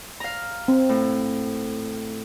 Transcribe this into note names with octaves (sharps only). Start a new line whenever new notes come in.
F5 A#5
C4
A2